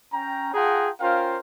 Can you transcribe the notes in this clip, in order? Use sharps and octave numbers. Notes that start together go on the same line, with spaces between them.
C#4 G5 A#5
F4 G#4 F#5 G5 A5 A#5
C#4 F4 A#4 C5 F5 G5